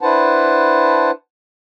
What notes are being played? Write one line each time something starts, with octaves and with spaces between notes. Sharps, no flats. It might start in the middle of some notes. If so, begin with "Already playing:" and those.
D4 E4 B4 C5 F#5 A5